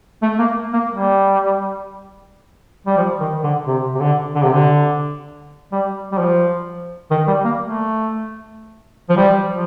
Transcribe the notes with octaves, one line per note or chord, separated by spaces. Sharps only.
A3
A#3
A#3
G3
G3
F3
D#3
D3
C3
C3
D3
D3
C3
D3
G3
G3
F3
D#3
G3
A#3
A3
F3
G3
F3